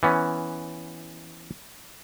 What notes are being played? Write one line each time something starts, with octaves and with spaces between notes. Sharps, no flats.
E3 B3 C#4